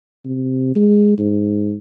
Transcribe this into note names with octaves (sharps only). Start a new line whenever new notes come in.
C3
G#3
G#2